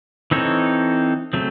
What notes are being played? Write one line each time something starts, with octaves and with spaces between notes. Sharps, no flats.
E3 C4 D#4 A4 C#5
C#3 F#3 A3 C4